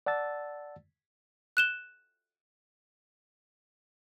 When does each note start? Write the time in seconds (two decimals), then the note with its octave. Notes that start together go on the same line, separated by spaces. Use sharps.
0.06 D5 F#5 A5 E6 A6
1.57 F#6 E7 G7